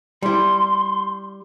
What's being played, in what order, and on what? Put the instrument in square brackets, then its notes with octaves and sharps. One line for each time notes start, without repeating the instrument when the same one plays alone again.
[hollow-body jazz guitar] G3 E4 [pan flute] C6